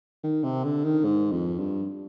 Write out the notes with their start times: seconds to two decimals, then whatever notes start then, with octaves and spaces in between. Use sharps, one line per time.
0.23 D#3
0.43 C3
0.64 D3
0.84 D#3
1.04 G#2
1.31 F2
1.59 G2